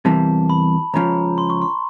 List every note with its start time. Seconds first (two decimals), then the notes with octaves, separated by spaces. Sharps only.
0.05 E2 C3 E3 G3 A#3 A5
0.50 B5
0.94 C#2 C#3 F3 A#5
1.38 C6
1.50 C#6
1.62 C6